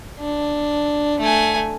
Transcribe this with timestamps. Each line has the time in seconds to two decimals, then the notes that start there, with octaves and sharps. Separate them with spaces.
0.20 D4
1.20 A3 G#5